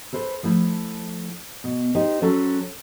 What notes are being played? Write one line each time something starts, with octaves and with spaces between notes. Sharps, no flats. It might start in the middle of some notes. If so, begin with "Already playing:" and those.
A4 B4 C5
F3 A3 E4
B2
D#4 G4 C5
F#3 C#4 F#4 A4 C5